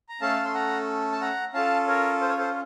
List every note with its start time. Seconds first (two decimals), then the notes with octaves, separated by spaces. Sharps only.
0.09 A#5
0.21 A3 C#4 A4 F5 A5
0.45 C6
0.54 F#5 A#5
1.12 A5
1.21 F#5 A#5
1.54 C#4 F4 A4 F5 A5
1.88 A#4 C#5
2.21 C5
2.29 C#5
2.38 A4 C5